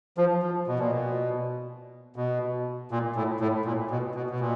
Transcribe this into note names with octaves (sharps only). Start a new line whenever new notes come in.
F3
F3
B2
A#2
B2
B2
A#2
A2
A2
A#2
B2
B2
B2
A#2